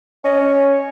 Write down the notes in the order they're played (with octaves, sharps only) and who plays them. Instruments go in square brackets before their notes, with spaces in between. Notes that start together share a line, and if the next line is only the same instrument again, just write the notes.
[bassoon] C#4 [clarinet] D#5
[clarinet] C#5